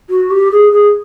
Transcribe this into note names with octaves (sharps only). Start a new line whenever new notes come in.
F#4
G4
G#4
G#4